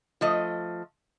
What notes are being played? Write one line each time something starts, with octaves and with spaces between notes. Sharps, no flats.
F3 A3 D#5